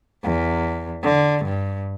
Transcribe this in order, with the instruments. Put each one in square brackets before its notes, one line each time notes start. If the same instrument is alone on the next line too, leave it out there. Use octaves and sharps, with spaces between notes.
[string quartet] E2
D3
G2